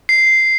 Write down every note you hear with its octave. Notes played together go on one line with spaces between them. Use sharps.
C7